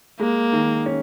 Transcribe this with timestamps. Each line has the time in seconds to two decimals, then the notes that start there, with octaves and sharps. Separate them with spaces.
0.19 G#3 A#3
0.53 D#3
0.86 C#4